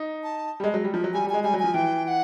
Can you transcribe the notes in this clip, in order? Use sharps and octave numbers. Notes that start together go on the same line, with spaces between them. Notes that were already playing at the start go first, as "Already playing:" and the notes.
Already playing: D#4
A5
G3
G#3
F#3
G3
F3
F#3
G3 G#5
G3
G#3 G#5
G3 G#5
F#3
F3 G#5
E3 G5
G5
F#5